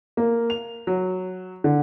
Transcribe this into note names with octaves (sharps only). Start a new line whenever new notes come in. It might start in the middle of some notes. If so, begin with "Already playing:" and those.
A#3
F7
F#3
D3